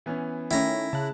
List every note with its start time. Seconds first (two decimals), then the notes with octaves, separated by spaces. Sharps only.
0.06 E3 B3 C#4
0.51 D#3 A3 C#4 E4 G5 A#5
0.93 C#3 A5 F#6